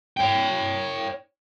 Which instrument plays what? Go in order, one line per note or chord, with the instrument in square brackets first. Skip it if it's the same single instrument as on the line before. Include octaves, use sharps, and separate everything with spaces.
[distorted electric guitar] C#5 G5